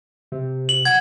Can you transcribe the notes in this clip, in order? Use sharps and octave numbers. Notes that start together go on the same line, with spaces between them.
C3
F#7
F#5 G#6